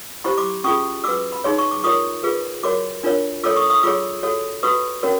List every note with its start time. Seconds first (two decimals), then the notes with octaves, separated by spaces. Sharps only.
0.24 E4 G4 C5 B5 C#6
0.38 C6 D6
0.64 C#4 F4 G#4 C#6 D#6
1.04 F#4 B4 D6 E6
1.32 B5
1.44 D#4 G#4 C#5 C6
1.59 C#6
1.71 D6
1.84 F4 A#4 C#5 C#6 D#6
2.23 F4 G#4 B4
2.63 F#4 A#4 C#5 C6 D6
3.03 D4 F4 A#4 C#5
3.43 F4 A4 C#5 D6 E6
3.56 C#6 D#6
3.70 C#6 D#6
3.83 F4 G#4 C#5 D6 E6
4.23 F#4 A4 C#5
4.63 F#4 B4 C#6 D#6
5.03 C#4 F#4 A#4 C#5